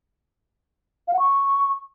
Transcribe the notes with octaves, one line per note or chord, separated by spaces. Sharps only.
F5
F#5
C#6